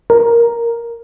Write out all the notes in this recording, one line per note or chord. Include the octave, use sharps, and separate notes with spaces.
A#4